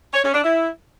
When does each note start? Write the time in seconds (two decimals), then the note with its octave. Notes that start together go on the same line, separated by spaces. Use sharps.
0.13 C#5
0.24 C#4
0.34 D4
0.44 E4